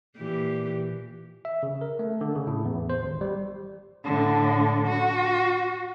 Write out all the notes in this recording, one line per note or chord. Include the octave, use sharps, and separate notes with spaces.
A#2 E3 G4
E5
C#3
A#4
A3
D3
C#3
A2
E2
C5
G#1
G3
A2 D3
F#4